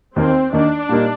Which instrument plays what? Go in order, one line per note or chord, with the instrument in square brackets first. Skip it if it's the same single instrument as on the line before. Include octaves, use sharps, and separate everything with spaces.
[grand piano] D#2 D#3 A#3 D#4 [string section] C4
[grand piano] D#2 D#3 A#3 D#4 [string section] D4
[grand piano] A#2 G3 A#3 D#4